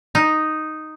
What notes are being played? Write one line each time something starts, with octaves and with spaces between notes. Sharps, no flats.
D#4